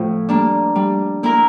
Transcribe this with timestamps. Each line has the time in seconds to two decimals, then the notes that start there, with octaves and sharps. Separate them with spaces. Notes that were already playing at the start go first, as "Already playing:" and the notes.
Already playing: A2 F3 C4 F4 C5
0.29 G3 A#3 D4
0.76 G3
1.23 A#3 E4 A#4